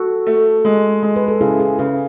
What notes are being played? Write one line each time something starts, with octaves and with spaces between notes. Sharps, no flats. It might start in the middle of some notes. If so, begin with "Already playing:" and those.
Already playing: F#4 A4
A3
G#3
G#3
B4
A4
C#3 E4 G#4
E4 G#4
C#3 G#4 B4